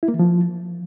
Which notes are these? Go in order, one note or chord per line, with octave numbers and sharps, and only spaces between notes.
E4
A#3
E3
F3